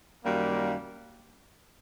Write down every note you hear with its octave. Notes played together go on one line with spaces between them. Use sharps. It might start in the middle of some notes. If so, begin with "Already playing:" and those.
F#2 D#3 G3 A#3